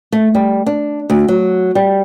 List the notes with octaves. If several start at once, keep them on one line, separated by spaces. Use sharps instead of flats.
A3
G3
D4
D2
F#3
G3